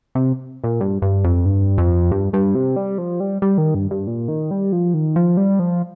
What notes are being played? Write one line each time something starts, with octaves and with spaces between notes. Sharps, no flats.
C3
A#2
G2
G2
F2
G2
F2
G2
G2
C3
G3
F3
G3
G3
D#3
G2
G2
A#2
D#3
G3
F3
D#3
F3
G3
F3